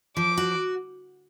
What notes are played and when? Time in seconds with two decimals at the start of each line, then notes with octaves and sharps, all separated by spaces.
0.17 F3 D6
0.37 F#4